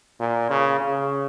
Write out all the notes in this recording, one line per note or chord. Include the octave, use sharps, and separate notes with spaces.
A#2
C#3
C#3